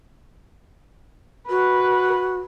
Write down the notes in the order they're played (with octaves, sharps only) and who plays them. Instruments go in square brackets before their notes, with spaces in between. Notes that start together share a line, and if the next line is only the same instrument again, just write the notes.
[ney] F#4 [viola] B4